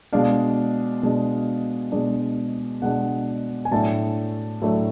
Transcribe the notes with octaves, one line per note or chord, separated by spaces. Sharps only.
B2 G#3 D4 F5
B2 G#3 D4
B2 G#3 D4
B2 G#3 D4 F#5
G#5
A2 F#3 A3 D4 A5
A2 F#3 A3 D4